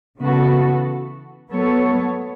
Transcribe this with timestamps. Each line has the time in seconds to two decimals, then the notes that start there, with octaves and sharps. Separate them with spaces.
0.20 C#3 E3 B3 F#4 A4
1.50 F#3 B3 A4 C#5